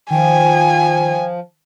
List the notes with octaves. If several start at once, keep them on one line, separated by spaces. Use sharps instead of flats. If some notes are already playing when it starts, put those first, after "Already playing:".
D#3 F3 G5 G#5